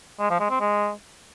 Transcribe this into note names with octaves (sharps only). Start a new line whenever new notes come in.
G#3
F3
G#3
C4
G#3